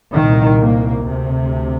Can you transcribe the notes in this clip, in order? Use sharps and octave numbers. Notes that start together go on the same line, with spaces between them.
C2 A#2 D#3
A#3
D2 C3